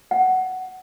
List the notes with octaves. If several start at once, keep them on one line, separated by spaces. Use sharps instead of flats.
F#5